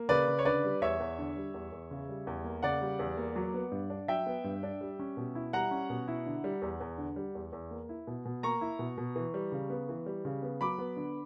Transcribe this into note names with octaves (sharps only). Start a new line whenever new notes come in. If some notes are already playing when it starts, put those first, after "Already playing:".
Already playing: A#3
C#3 B4 D5
C#3
C#5
D3 B4 D5
G3
E2 C#5 E5
E2
D3
G3
E2
E2
C#3
G3
E2
A#3
C#3 D5 F#5
G3
E2
A#3
F#3
B3
G2
D4
F#3 E5 G5
B3
G2
D4
G3
C#4
B2
E4
G3 F#5 A#5
C#4
B2
E4
D3
G3
E2
E2
D3
G3
E2
E2
A#3
E4
B2
B2
A#3 A#5 C#6
E4
B2
B2
E3
G3
C#3
B3
E3
G3
C#3
B3
F#3 B5 D6
B3
D3